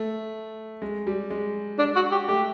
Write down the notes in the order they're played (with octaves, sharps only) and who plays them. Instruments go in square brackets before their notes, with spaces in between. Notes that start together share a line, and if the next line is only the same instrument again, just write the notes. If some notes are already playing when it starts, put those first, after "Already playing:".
Already playing: [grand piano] A3
G#3
G3
G#3
[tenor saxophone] D4
F#4
G4
[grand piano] A3 [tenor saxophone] G4